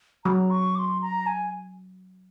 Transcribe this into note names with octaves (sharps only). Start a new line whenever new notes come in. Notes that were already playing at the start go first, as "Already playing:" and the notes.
F#3 A#5
C#6
D6
C6
A#5
G#5